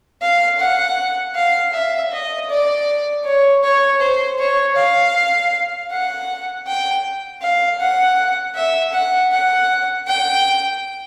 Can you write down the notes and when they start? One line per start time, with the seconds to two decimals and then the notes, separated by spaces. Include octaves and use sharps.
0.22 F5
0.60 F#5
1.35 F5
1.73 E5
2.12 D#5
2.50 D5
3.25 C#5
3.63 C#5
4.01 C5
4.39 C#5
4.76 F5
5.91 F#5
6.67 G5
7.42 F5
7.80 F#5
8.56 E5
8.93 F#5
9.32 F#5
10.07 G5